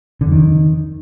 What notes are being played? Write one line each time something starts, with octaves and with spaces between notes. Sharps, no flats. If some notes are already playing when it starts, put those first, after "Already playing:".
D3
F2
D#3